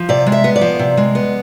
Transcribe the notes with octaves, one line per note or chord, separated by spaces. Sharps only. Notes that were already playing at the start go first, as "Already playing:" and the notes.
Already playing: F3
C3 D5
G#3
E5
B3
D5
F3
C3
G#3
B3